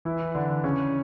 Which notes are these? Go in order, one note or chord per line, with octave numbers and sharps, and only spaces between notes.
E3 E4
D3 D4
C#3 C#4